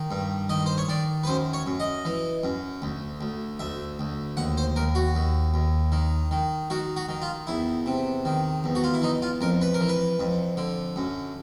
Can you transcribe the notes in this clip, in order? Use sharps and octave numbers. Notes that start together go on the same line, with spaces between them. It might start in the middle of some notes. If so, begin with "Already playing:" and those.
Already playing: D#3
G2
D#3 D#5
C5
C#5
D#3 D5
B4
F#2 C5
C#5
F#2
D#5
E3
F#2
D2
D2
D2 E5
D2
D#2 F#5
C5
D#2 A#4
F#4
D#2
D#2
D#3
D#3
D#3 F#4
F#4
D#3
F4
E2 E4
C3
D#3
E2
F#4
F4
E4
E3 D#4
F4
F2 A#4
B4
A#4
E3
B4
F2
D3
F#2